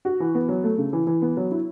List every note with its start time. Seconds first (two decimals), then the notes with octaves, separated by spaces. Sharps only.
0.05 F#4
0.20 E3
0.35 B3
0.49 F#3
0.64 A3
0.78 C#3
0.93 E3
1.07 E3
1.22 B3
1.37 F#3
1.51 E4